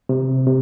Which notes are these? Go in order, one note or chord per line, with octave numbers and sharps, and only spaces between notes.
C3
C3